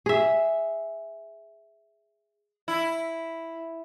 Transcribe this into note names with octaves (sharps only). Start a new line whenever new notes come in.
G#4 E5
E4